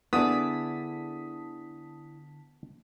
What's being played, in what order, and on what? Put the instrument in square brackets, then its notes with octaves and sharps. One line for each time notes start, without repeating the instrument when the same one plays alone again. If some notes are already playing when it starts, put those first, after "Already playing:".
[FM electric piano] D3 A5 B6 [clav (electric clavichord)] B3 [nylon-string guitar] E4 G#4 D5 [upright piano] D#6